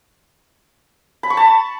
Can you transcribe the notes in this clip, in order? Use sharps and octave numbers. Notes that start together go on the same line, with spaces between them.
B5
C#6
A5